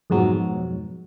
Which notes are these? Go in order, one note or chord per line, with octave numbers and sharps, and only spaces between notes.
F2 G#2 B2 F#3